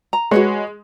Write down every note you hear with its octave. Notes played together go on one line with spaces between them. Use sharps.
A#5
G#3 F#4 B4 C#5